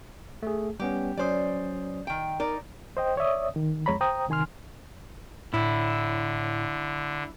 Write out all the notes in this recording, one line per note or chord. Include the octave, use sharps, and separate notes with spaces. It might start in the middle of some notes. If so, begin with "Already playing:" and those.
A3 G#4
G3 B3 C#4 G4
F#3 C#4 C5 D5 D#6
D#3 G5
D#4 A#4 D5
C5 D#5 G5
C#5 D5 E5 D#6
D#3
F2 G#3 C#5 A#5 B5
C5 G5 A#5 D#6
C3 D#3 G#5 C6 F6
A2 D3 E4